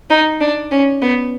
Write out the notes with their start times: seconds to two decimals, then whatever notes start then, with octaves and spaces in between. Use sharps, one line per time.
0.10 D#4
0.41 D4
0.71 C#4
1.02 B3